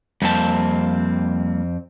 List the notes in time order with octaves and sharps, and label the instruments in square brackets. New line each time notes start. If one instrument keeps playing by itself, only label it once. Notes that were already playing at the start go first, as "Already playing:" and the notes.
[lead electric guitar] F2 C4 [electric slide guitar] G3 A#3 A5